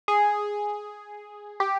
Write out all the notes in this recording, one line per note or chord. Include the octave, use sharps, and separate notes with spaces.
G#4
G4